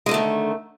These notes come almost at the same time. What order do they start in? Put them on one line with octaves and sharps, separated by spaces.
G#3 D3 A3 D#3